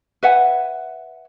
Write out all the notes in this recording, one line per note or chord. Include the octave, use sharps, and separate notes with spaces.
B4 E5 F#5 G#5